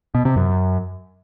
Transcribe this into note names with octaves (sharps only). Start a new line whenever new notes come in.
B2
C3
F#2